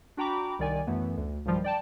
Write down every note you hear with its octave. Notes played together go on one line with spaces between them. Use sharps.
D4 F#4 G5 A#5 B5 D6
C2 D#3 D5 G#5
F#2 E3 A3 B3
D2
B1 G2 D#3 F3 G3
D5 G5 A5